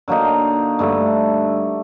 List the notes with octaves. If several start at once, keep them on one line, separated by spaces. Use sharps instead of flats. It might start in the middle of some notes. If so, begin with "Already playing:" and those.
D3 F#3 A#3 D#4
G2 D3 A3